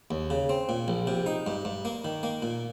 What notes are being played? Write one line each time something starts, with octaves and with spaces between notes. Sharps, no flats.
D#2
C#3
C4
A#2
A#1
C3
D#4
G2
G2
A#3
D#3
A#3
A#2